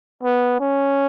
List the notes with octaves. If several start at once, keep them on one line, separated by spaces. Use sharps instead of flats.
B3
C#4